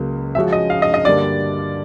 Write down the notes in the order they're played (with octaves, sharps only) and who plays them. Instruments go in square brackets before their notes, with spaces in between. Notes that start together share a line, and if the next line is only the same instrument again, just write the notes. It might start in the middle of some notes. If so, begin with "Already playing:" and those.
Already playing: [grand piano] C#2 C#3 F#3 A#3
[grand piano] C#3 F3 G#3 C#4 F#4 [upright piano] E5
[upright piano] D#5
F5
D#5
D#5
[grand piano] G2 D3 G3 A#3 [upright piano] D5